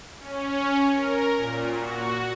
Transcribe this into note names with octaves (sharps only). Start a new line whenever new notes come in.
C#4
A#4
A#2
F#4